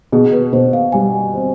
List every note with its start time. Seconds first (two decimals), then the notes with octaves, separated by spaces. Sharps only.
0.12 B2 G#4
0.33 B4
0.53 B2 C5
0.73 F5
0.92 G3 G#5
1.33 C4